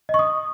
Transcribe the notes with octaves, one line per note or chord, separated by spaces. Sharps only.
D#5
C#6
D#6